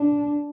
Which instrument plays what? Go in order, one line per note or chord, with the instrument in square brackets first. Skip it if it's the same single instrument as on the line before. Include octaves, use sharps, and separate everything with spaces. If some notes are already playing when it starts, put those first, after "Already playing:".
Already playing: [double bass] D4